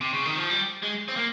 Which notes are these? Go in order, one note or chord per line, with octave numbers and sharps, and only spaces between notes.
C3
C#3
D#3
F3
G3
G#3
C4
A#3